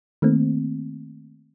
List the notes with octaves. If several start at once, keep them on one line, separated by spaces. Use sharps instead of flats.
D#3 A3 A#3 C4